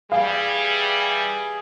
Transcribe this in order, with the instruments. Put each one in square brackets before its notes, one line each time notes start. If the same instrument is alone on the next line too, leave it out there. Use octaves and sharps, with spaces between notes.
[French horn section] E3 G3 [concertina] G#4 [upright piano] F5